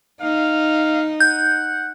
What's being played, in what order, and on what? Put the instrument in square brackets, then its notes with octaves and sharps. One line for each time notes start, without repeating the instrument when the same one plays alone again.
[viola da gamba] D#4 [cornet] F5
[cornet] F#5 [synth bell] G6